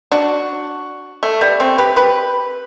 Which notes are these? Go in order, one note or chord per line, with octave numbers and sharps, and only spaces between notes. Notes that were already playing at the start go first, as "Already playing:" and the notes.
D4 F#4
A3
G3 B3
A3 C4
G4 B4
G4 B4